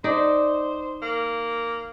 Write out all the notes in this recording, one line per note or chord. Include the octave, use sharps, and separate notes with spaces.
D#4 C5 D5
A#3